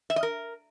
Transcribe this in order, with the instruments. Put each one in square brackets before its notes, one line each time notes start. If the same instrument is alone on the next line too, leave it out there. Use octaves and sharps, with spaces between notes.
[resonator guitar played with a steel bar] E5
D#5
A#4